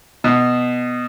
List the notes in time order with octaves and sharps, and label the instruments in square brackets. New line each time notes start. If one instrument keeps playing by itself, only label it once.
[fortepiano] B2